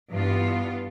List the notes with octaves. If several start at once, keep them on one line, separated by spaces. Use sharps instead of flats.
G2 E3 B3 F4